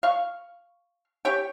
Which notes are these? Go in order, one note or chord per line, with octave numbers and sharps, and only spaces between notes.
F5 C#6
G4 C#5 G5